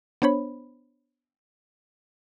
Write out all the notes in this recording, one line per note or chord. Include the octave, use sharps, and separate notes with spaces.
B3 D4 C5 C#5 B5